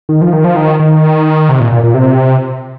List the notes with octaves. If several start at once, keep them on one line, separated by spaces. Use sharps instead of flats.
D#3
F3
D#3
F3
D#3
D#3
C3
A#2
A#2
A#2
C3